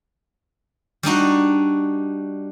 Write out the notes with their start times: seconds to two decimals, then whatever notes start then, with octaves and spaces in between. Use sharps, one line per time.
1.03 G3 D4 D#4 F#4